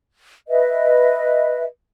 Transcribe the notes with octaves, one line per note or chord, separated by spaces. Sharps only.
B4 D#5 E5